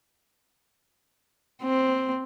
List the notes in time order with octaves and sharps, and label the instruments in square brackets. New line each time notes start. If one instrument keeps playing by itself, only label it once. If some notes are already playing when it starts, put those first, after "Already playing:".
[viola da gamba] C4